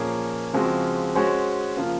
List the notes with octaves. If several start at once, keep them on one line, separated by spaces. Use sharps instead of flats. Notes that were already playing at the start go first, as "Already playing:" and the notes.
Already playing: A#2 F3 A#3 C#4 G#4
C#3 F3 G#3 C4 F#4
G#3 C#4 F#4 C5
C#3 F3 A#3 F4